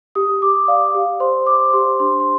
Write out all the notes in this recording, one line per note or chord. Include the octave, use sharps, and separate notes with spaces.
G4 D#6
G4 D6
D5 F5
G4
C5 C6
C5 D6
G4 C6
D4 C6
C6